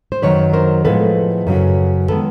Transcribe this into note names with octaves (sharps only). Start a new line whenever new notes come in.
C5
F#2 D#3 F#3 B4 C#5
A#4 C5
A2 F3 G#3 B3 A4 B4
F#2 C#3 F#3
D#3 G#3 B3 A4 B4